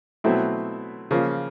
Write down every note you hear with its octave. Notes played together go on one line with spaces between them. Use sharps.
B2 F#3 A3 C4 E4
C#3 F3 A#3